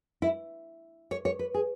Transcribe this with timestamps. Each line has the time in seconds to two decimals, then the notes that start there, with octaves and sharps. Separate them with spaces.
0.22 E4
1.11 C#5
1.25 C#5
1.39 B4
1.54 G#4